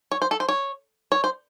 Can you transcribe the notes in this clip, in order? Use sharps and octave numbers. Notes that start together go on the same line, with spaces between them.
C#5
C5
A4
C5
C#5
C#5
C5